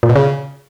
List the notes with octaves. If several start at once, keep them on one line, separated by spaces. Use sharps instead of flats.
A#2
B2
C#3